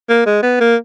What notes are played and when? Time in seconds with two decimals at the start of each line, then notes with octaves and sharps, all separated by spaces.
0.09 A#3
0.26 G#3
0.42 B3
0.60 A#3